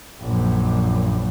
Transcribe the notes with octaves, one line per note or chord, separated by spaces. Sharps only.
A#1 F#2